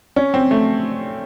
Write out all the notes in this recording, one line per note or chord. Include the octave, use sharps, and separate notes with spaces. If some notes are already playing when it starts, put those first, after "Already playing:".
C#4
C4
A3